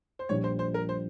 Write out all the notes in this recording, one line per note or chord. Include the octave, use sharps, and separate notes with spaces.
C5
A#1 A#2 G3 C#5
C5
C5
A#4
C5